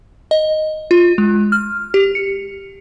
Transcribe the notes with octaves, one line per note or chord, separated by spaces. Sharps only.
D#5
F4
G#3
F6
G4
C#7